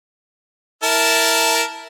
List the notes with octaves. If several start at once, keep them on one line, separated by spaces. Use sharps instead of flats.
E4 A#4 A5